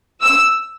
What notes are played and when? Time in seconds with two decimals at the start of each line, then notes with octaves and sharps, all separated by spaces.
0.22 E6